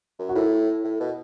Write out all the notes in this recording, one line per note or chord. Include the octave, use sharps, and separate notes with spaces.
F#2
F#4
A2 E4
A2
B2